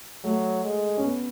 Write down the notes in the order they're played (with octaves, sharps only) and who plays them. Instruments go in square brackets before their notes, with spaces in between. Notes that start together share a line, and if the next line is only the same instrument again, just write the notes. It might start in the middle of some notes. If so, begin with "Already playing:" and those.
[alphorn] F#3 [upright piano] A3
[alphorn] G#3
[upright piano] C#4
B3